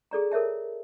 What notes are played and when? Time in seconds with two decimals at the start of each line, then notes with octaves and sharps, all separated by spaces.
0.11 G#4 A4 D5 A#5
0.31 A4 A#4 C#5 E5 A5